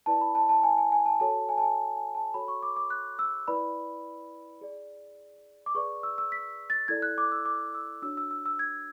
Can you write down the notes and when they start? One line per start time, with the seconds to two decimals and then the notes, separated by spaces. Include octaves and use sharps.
0.06 E4 B4 D5 A5
0.21 B5
0.35 A5
0.49 A5
0.63 G#5
0.78 G#5
0.92 G#5
1.06 A5
1.20 F#4 A4 C#5 A5
1.49 G#5
1.58 A5
1.63 G#5
1.97 G#5
2.15 A5
2.34 F#4 A4 C#5 B5
2.48 C#6
2.63 D6
2.77 D6
2.90 F#6
3.19 E6
3.48 E4 B4 D5 B5
4.61 G#4 D5
5.66 D6
5.75 G#4 B4 D5 C#6
6.03 E6
6.18 E6
6.32 B6
6.70 A6
6.88 E4 A4 D5 G#6
7.02 F#6
7.18 D6
7.32 E6
7.46 D6
7.75 E6
8.02 D4 F#4 C#5 E6
8.17 E6
8.31 E6
8.46 E6
8.59 G#6